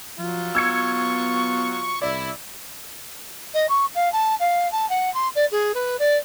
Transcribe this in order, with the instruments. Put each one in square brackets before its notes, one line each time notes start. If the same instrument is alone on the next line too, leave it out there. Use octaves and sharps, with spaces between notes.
[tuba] F3 [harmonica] F#3 F4
[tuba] B3 [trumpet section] C#6 [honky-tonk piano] E6 G#6 C#7
[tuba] C2 [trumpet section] E4 [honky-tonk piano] D5
[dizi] D#5
C#6
F5
A5
F5
A5
F#5
C6
D5
G#4
B4
D5